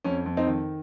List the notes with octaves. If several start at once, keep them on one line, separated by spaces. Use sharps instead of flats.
F2 C#4
F2
C4 D#4
D#3